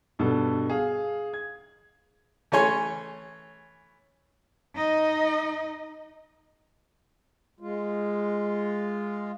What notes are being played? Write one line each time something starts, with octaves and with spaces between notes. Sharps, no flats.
G2 B2 A4
G#4 F5
G#6
E3 A3 C#4 C#5 G#5 C6
D#4 D#5
G#3 F4